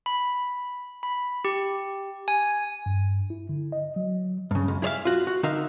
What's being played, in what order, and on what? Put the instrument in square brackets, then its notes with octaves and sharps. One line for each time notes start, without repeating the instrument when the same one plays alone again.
[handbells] B5
B5
G4
G#5
[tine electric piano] G2
E4
D3
D#5
F#3
[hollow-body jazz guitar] G2 C#3
C#2 F#2
E4 G#4 C#5 D5 E5 F5
F4 F#4
F#4
D3 D#4 A#4 E5 F5